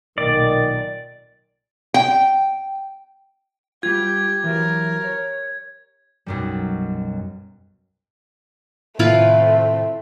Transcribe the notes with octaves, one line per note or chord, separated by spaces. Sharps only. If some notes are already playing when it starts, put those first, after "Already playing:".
B1 A#2 D#3 D5
G5
G3 F4 G4 G#6
E3 F#3 A#4
C#5
B1 F#2 G3
A2 C3 D#3 A3 C4 E4 F4 B4